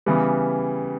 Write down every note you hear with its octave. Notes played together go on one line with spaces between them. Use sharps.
C#3 E3 G3 B3